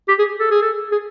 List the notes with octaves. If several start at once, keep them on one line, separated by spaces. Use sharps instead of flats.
G4
G#4
A4
G#4
A4
G#4